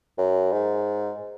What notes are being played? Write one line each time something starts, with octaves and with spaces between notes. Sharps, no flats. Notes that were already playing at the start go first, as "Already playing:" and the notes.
F#2
G#2